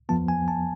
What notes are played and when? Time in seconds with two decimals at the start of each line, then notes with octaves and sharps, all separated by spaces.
0.09 F2 F3 B3 A5
0.28 G#5
0.48 A5